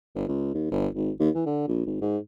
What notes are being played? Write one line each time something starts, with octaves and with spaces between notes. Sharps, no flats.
G1
C#2
D#2
G1
G#1
D#2
E3
D3
A#1
G#1
G#2